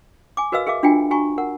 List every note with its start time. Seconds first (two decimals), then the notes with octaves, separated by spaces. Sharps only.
0.37 G#5 D6
0.52 F#4 A#4 B4 D#5 F5 E6
0.67 G#4 A#4 E5 F5 D6
0.83 D4 F4 F#4 G5 G#5
1.11 F#4 G#5 A#5 C#6
1.38 A#4 F#5